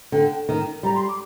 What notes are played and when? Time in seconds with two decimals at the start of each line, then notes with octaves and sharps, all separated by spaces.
0.12 D3 G5
0.49 D#3
0.83 G3 A#5
0.95 C6
1.08 D6